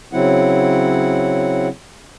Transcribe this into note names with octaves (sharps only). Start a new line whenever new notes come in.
C#3 F#3 C4 E4 F#5